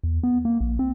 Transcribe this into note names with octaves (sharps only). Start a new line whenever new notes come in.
E2
B3
A#3
A#1
C4